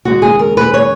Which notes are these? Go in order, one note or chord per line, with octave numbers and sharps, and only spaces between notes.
D#2 C#3 G#3 F#4
G#4
A#4
B4
C#5